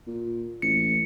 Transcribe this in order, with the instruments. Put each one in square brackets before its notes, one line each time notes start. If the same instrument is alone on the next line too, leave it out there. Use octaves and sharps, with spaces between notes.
[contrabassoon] A#2
[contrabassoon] A1 [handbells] C#7